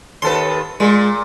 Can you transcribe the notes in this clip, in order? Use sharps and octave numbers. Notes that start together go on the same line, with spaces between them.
D#2 A4 B4 C6
A#2 G#3